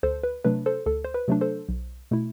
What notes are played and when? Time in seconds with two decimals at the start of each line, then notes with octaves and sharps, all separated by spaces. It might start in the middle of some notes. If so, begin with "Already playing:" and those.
0.03 D2 A4 C5
0.23 B4
0.44 C3 F#3 A3 D4 B4
0.66 A4 C5
0.86 D2 A4
1.05 C5
1.14 B4
1.28 C3 F#3 A3 D4
1.41 A4 C5
1.69 B1
2.11 B2 A3 E4